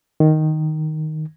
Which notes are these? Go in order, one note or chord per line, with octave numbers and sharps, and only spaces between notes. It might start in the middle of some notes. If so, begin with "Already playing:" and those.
D#3